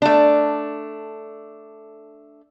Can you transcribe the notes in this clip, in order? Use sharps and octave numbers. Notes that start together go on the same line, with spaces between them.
A3 D4